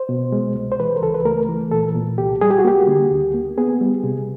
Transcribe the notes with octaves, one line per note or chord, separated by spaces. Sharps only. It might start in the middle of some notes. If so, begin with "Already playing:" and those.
Already playing: C5
B2
G#3
C2
C5
E3 B4
A#4
C#2 A4
B4
A3 A#4
E3
A#2 A4
A#2
C2 G4
G3 G#4
G4
F#4
A#3 G4
D3
D2
A#3
B3 G#4
G3
C3